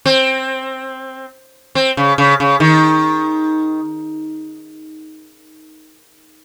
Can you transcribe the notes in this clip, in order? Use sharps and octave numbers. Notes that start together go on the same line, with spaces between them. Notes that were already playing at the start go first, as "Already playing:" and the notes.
C4
C4
C#3
C#3
C#3
D#3